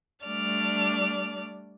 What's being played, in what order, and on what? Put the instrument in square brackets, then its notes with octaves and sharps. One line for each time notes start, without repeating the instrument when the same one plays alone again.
[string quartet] G3 A3 D4 D5 F6